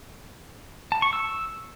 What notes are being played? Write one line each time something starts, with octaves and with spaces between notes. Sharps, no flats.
A5
C#6
E6